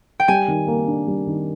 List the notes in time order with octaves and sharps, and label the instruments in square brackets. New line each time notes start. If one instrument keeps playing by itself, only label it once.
[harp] G5
[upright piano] G3 [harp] G#5
[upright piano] D#3
A#3
D4
G3
D#3